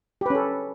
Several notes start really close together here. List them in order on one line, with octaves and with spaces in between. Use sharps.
G4 B4 C#4 A4